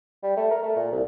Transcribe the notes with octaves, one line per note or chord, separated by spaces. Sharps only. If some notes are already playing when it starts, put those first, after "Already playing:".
G3
A3
A#4
A3
A#2
C2